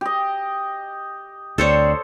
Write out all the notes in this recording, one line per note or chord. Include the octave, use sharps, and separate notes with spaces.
G4 D#5
D2 G3 C4 D4 A4 C5 C#5